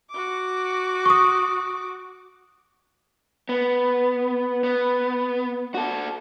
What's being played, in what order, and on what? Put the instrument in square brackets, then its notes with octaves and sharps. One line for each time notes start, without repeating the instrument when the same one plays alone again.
[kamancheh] F#4 D6
[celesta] C#6 D#6
[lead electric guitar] B3
B3
F#4 A4